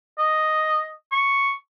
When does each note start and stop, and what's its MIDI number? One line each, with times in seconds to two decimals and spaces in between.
0.18 0.92 75
1.12 1.53 85